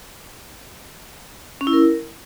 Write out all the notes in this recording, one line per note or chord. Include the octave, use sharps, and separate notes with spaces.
C#4
E4
A#4